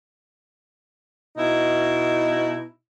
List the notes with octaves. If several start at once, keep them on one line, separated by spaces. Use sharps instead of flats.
B2 D#4 E4